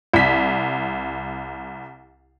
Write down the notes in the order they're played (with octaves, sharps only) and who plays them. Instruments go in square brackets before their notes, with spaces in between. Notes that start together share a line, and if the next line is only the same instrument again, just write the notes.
[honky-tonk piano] C2 B6